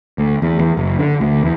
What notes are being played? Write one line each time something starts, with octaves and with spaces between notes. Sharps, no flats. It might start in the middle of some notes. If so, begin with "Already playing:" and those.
D2
E2
E2
F#1
D3
D2
E2